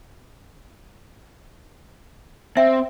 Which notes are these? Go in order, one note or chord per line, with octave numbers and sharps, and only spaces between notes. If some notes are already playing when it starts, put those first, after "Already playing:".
C4 E5 G5